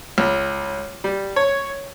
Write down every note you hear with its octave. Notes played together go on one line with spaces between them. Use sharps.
C#2
G3
C#5